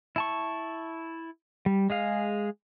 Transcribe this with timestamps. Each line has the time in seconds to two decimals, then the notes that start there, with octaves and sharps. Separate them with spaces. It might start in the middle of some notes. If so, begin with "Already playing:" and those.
0.16 E4 A5 C#6
1.66 G3
1.90 G#3 G#4 F5